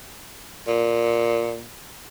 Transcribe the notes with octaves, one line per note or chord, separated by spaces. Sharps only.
A#2